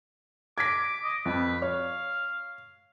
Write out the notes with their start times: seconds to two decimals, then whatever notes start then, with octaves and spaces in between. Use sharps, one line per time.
0.58 D6 G#6 A#6 B6
1.04 D#5
1.25 F2 B4
1.62 C#5 F5